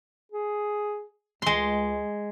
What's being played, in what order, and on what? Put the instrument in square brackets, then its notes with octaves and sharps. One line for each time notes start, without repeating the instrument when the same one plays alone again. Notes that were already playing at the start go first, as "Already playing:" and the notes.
[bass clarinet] G#4
[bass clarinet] C#2 [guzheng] G#3 C6